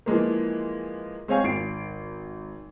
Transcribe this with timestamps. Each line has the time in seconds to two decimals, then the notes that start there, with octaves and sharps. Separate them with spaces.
0.06 E3 F3 G#3 A#3
1.28 G#3 C4 C#5 F5 G#5
1.44 G#1 C7 D7